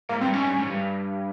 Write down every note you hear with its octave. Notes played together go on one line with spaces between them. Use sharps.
G#2 A#3
G2 C4
G#2 C#4
G2
G#2
G2